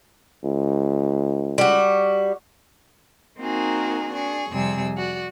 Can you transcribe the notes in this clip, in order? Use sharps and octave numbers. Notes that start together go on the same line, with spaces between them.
C#2
G3 F#4
A#3 C4 D#4 F#4 G#4 A#4
D4 G#4 C#6
F2 C3 G3 G#4 E6
F#4 D5